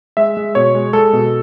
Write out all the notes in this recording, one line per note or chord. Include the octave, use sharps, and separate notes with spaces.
G#3 E5
G#3
B2 C#5
G#3
G#3 A4
B2